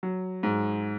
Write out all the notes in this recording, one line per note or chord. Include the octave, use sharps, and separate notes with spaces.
F#3
G#2